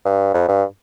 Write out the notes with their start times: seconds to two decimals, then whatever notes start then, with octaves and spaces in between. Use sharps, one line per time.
0.05 G2
0.34 F2
0.48 G2